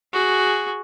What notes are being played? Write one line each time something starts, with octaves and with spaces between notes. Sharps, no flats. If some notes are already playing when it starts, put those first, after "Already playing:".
F#4 G#4